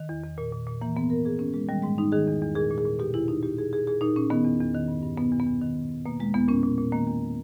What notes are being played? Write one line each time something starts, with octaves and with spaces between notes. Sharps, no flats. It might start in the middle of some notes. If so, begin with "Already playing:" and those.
Already playing: D#3
E2
E2
A#2
A#2
A#2
E3 A#3
G#2 B3
G#2 A#4
A#2 G#4
A#2 C#4
A#2 G#3
D#3 G3
G#2 G#3
G#2 D#4
D#3 G#4
E2
E2
A#2 G#4
A#2
G#4
A#2
B2 G4
E2 E4
E2 D#4
A#2 G4
A#2 G#4
A#2 G#4
A#2 G#4
A#2 D#4
A#2 C#4
D#3 B3
E2
E2
D#3
G2
G2
B2 B3
E2
B3
E2
D#3
G#2
G#2
B2 A#3
E2 G#3
E2 B3
A#2 C#4
A#2
A#2
D#3 A#3
E2